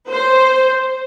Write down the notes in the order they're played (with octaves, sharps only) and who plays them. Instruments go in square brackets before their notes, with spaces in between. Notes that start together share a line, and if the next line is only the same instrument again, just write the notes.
[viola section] C5